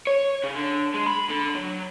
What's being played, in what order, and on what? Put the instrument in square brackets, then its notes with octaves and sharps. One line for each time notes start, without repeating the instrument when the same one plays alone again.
[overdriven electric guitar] C#5
C#3
D3
G#3
B5
D3
F#3